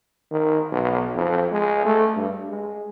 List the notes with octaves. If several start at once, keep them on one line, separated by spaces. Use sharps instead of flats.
D#3
B1
F2
G#3
A3
G2
G#3